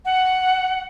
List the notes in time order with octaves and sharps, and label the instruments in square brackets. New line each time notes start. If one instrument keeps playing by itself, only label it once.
[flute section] F#5